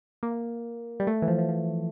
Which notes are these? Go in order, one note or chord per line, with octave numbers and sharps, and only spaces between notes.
A#3
G3
A3
E3
F3
F3
F3